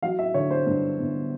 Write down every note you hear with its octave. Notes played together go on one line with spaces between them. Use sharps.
F#3 F5
E5
D3 C#5
C5
G2
G1